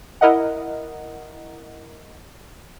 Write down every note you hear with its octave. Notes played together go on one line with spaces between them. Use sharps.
E4 A#4 D#5 F#5